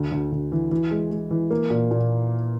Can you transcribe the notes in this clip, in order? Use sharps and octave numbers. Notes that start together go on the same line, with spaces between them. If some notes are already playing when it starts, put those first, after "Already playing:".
Already playing: D2
D2
D2
E3
E3
G#3
G#3
E3
A#3
A#2
A#2